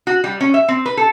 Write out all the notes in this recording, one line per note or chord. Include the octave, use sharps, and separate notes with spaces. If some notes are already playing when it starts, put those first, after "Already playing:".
F#4
G3
C#4
E5
C4
B4
A4